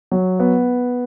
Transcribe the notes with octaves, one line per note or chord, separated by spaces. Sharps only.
F#3
B3